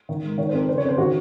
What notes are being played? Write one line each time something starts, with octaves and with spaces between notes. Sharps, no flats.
D#3
G#2
D#3 C#5
C5
F2 A#4
C#3 C5
C#5
F2
C5
D#3 F#4